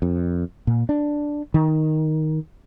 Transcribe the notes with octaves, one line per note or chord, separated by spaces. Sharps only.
F2
A#2
D4
D#3